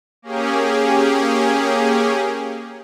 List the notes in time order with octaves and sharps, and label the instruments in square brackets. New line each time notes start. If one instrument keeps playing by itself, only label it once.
[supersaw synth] A#3 C#4 G4 G#4